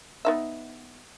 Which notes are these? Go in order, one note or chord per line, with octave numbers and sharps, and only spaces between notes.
B3 D#4 E5